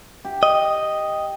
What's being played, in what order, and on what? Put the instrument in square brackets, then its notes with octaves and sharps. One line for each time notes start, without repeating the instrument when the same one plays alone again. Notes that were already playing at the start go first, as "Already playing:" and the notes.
[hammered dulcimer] G4
[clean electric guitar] D#5